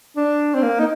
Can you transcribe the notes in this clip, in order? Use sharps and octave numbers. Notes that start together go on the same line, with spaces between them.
D4
C4
A#3
D#4